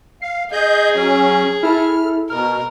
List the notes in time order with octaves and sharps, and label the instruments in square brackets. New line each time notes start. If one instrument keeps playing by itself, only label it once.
[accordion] F5 [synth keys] C7
[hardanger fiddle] G#4 [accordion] D#5 G6
[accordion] F#3 C#4
[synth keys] E4 A4 [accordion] F6
[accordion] B2 [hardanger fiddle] A#4 [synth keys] F6